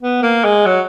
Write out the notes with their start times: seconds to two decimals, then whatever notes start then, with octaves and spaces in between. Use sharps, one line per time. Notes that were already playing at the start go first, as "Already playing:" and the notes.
0.01 B3
0.22 A#3
0.44 G#3
0.65 F#3